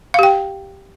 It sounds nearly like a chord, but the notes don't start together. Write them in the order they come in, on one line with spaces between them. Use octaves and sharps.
F5 G4 G5